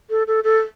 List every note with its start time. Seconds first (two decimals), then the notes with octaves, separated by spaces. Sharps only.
0.10 A4
0.27 A4
0.44 A4